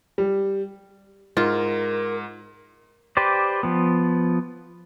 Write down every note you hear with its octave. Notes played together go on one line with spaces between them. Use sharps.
G3
G#2 F4 A#4
G4 B4 C5 D5
F3 B3